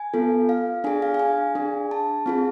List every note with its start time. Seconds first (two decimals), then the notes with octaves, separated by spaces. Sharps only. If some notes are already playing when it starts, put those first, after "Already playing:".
Already playing: G#5
0.14 B3 F4 A4
0.49 F5
0.84 D4 G#4 G#5
1.02 F5
1.14 F5
1.19 G#5
1.55 D4 G#4
1.91 A5
2.26 C4 F4 G#4